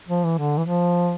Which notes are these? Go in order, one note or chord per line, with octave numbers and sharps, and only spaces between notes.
F3
E3
D3
E3
F3